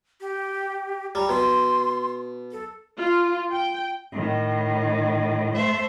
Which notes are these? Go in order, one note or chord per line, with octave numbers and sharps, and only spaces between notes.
G4
G3 A#5
B2 C6
A4
F4
G5
A2 D#3
A3 C5 E5